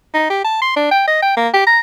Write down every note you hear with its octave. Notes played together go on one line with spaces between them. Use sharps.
D#4
G4
A5
C6
D4
G5
D#5
G5
A#3
G4
A#5